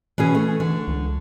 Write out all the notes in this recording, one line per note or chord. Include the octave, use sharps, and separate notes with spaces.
B2 E3 C#4 G#4
A3
D3 E3
C#2